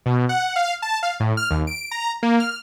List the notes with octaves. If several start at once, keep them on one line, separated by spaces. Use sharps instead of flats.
B2
F#5
F5
A5
F5
A2
F6
D#2
D7
A#5
A#3
F6